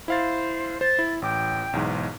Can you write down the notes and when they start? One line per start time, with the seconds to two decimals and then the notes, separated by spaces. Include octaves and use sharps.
0.08 E4 C5 F5 A6
0.81 C5 A6
0.99 E4
1.22 A1 G5 D6
1.73 B1 E2 G#2